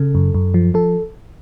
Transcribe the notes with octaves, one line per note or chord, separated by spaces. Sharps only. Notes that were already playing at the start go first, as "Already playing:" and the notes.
Already playing: C#3 A4
F#2
F#2
F3
F3 A4